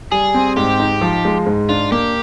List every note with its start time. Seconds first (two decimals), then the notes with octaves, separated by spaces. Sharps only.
0.12 G3 G#4
0.34 C4
0.56 G#2 G4
0.80 D#4
1.01 F3
1.25 G#3
1.47 G#2
1.69 D4 F4
1.92 A#3 G4